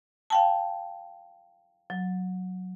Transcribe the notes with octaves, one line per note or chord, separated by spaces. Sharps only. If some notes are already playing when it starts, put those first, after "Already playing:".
F5 G5 A5
F#3